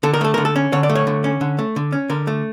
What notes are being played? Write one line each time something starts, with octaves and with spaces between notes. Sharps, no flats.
D3 A4
A#4
A3 A4
D3 A#4
A4
C#4
D3 C#5
D5
A3
C#5
D3
C#4
D3
A3
D3
C#4
D3 A#4
A3